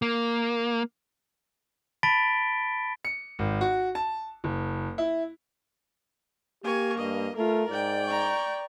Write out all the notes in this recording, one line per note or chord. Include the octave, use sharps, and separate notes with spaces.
A#3
A5 B5 A6 B6 D7 G7
C#7
G#1
F#4
A5
F#1
E4
A#3 G4 G#5 C#6
G2 D#5
A3 F4 A#4
G#2 D5 G5
A#5 C#6